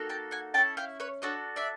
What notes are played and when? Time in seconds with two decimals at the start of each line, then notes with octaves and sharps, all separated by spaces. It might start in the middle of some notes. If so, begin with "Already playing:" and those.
Already playing: A#3 D#4 F#4 A4
0.09 G5 A5
0.31 F#5 G#5
0.54 C#4 E4 A4 G5 A5
0.77 F5 G5
1.00 B4 C#5
1.22 D4 F#4 A4 C#5 D#5
1.56 D5 E5